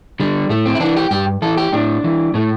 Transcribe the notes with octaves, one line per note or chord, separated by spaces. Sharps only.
D3 G3
A2 A3
C4
E4
E3 D4
G4
G2 G4
E3 A4
G4
A2 D4
E3
A2 A3